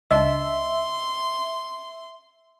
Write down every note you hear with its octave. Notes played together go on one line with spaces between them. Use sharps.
C#2 D4 D#5 E5 C6